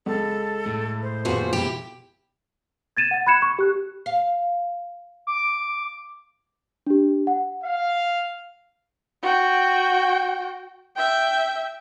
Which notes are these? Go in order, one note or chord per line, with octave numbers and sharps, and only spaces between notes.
C#2 A4
A2
C5
F#1 D#2 A#2 B3 F#4
B2 E4 G4
G#6 A6 D#7 E7
F#5 A6
B5 F#6 G#6 C#7 E7
C#6
G4 F#6
F5
D6
D4 G4
F#5
F5
F#4 G5
E5 G5